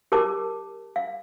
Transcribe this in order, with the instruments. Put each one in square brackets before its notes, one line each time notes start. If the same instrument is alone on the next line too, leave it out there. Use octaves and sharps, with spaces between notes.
[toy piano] G4 A#4 C#5 A5 D6
F5